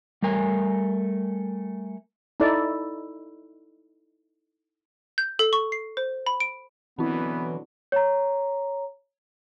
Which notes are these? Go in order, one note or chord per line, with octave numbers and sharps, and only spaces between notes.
G3 A3 A#4 G#5
D#4 E4 A4 D5
G6
A4
C#6
C7
C5
B5
D7
B2 D3 E3 F#3 B3 C4 E4
C#5 A#5